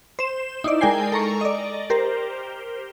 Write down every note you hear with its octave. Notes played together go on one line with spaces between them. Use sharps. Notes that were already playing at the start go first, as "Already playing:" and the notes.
C5 E7
D#4 E4 D5
G#3 A#4 D5 G5 G#5 C7
A4 A#5 C#6
D5 D#5
G4 A#4 C5